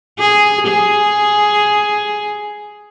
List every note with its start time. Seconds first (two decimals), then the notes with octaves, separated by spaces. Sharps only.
0.19 G#4
0.67 G#4